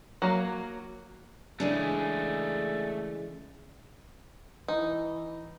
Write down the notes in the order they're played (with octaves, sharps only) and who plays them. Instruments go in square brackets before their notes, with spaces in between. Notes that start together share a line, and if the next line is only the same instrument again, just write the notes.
[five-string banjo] F#3 A#3
[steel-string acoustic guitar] C#3 E3 G#3 [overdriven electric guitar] A3 G#4 [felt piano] D4
[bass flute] E3 [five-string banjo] D#4